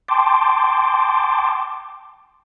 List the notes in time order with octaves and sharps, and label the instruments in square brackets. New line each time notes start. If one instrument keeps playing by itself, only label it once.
[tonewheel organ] G5 A5 C6 D6